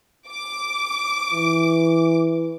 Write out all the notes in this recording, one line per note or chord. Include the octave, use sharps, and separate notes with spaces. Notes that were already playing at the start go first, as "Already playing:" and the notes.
D6
E3